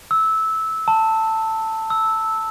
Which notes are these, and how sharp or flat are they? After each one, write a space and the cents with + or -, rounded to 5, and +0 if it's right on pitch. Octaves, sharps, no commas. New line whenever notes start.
E6 -15
A5 +15
E6 -10